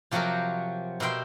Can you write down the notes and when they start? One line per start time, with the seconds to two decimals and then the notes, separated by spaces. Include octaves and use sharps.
0.11 C3 F3 F#3 F#4 G4 A#4
1.00 B2 A#4 E5 G5 C6